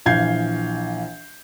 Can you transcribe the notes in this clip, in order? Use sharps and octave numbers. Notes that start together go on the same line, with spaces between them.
A#1 E3 F5 G6 G#6 C7